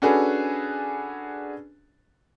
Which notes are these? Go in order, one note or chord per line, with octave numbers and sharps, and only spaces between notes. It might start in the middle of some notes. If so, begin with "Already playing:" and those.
C#4 D4 F#4 G#4 A4 B4